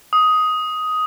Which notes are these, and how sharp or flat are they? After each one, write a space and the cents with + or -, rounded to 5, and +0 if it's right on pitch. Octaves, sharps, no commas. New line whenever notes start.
D#6 +10